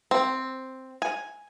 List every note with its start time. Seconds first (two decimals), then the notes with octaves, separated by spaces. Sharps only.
0.11 C4
1.02 G#5